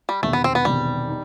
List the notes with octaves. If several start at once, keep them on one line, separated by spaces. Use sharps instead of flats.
G3
E1 E2 C3 D#3 A3
B3
C4
B3
E1 E2 C3 D#3 G3
D#4